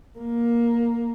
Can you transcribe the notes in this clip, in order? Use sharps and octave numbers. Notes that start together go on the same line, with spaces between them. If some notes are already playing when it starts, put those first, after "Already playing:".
A#3